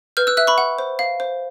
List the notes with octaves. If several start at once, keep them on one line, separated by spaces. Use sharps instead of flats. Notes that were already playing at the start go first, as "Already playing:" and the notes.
B4 F6 G6
E6 F#6
E5 E6 F#6
B5 C#6
F#5
C5
F5
C5